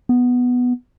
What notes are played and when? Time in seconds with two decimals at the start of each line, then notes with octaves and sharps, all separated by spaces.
0.09 B3